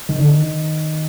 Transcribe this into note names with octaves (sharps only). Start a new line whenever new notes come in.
D#3
D3
D#3